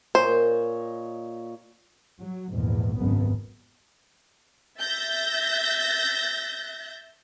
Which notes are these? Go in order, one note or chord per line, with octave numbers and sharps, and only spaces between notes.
A#2 C5 C#5 D#5
F#3
A#1 E2 G#2
G#1 C#2 F#2 C#3 B3
E5 G6 A6 A#6